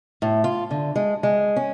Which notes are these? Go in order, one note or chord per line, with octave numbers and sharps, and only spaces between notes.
A2
F4
D3
G#3
G#3
C#4